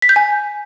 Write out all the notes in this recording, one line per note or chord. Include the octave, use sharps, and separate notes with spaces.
B6
G6
G#5